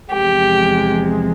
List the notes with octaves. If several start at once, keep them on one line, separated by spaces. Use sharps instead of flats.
E2 C3 F3 G#3 G4